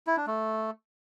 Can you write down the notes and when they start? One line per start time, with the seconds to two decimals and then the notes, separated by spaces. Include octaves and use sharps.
0.07 E4
0.17 D4
0.27 A3